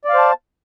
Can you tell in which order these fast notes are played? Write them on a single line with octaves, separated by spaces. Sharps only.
D5 F5 C5 A5